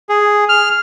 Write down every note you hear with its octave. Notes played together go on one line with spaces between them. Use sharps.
G#4
F6